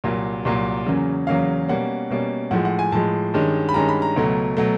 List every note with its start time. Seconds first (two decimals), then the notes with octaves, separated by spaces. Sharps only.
0.04 C2 A#2 F#3 A#3
0.45 C2 A#2 F#3 A#3
0.87 E2 C#3 F#3 A#3 C#4
1.27 E2 C#3 F#3 A#3 C#4 F5
1.68 B2 G3 A#3 C#4 F#5
2.10 B2 G3 A#3 C#4
2.51 A2 F3 G#3 F#5
2.65 F#5
2.79 G#5
2.92 A2 F3 G#3 A5
3.34 G2 D#3 G#3 C#4
3.69 B5
3.74 G2 D#3 G#3 C#4 A#5
3.89 B5
4.02 A#5
4.16 C#2 B2 F#3 A3
4.57 B2 F#3 A3